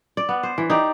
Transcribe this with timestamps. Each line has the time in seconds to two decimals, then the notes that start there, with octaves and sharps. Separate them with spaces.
0.17 D5
0.29 B3
0.43 C5
0.58 E3
0.70 D#4 G4 D5